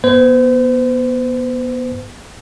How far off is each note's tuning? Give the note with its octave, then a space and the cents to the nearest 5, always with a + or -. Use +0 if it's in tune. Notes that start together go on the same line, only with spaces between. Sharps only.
B3 -20 C5 -40